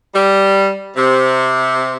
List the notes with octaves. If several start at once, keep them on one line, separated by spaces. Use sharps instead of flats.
G3
C3